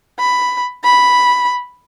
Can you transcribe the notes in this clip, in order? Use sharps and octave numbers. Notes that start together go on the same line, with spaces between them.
B5
B5